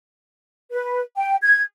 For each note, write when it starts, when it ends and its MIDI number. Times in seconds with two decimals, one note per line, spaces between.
0.71 1.01 71
1.17 1.36 79
1.42 1.61 92